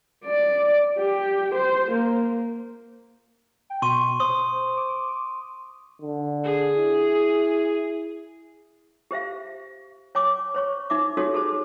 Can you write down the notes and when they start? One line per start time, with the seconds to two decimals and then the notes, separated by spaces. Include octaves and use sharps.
0.25 D5
0.98 G4
1.55 C5
1.91 A#3
3.70 G5
3.82 B2 C6 C#6 D#7
4.20 C5 C6 D#6
4.77 D6
6.02 D3
6.44 G#4
6.77 E4
9.11 G4 C5 E5 F5
10.15 C#5 G#5 D6
10.54 C5 C#5 C#6
10.90 D#4 E5 D6
11.17 D#4 F#4 G4 A4 C#5 D#6
11.34 G#4 A4 C5